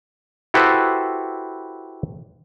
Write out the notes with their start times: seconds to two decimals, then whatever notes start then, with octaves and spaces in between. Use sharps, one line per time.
0.54 E4 F#4 G4 A4 B4 C5